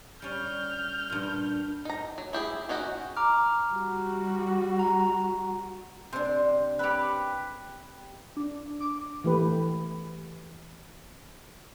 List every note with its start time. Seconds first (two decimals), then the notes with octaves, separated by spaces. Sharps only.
0.22 G3 C#4 F6 G6
1.10 G2 A#2
1.85 D#4 A#5
2.18 F#3
2.33 E4 G4 G#4
2.69 C#4 D#4 F#4 G4
3.17 A#5 D6 F6
3.72 G3 F#4
4.79 A#5
6.13 C3 D4 C5
6.79 C4 G4 B4 C#5
8.37 D4
8.81 D6
9.24 E3 A3 G4 B4